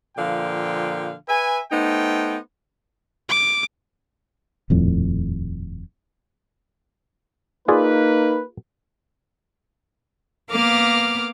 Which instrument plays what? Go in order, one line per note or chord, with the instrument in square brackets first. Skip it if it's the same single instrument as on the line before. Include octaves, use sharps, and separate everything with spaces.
[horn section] A#2 D3 F3 F5 G5
B4 E5 G#5
A3 B3 D#4 C5 G5
[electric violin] D6
[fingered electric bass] D#1 F2 A2
[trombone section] A#3 B4 [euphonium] D#4 [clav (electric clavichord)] F4 G#4 D5
[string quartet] A#3 B3 A#4 F5 D6 F6